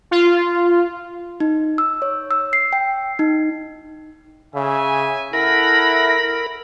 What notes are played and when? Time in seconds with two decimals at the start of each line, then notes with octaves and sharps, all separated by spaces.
0.11 F4
1.40 D#4
1.78 E6
2.02 C#5
2.31 E6
2.53 C7
2.73 G5
3.19 D#4
4.55 C#3 E5 G#5
5.33 E4 A4 A#4 F#5 B5 A#6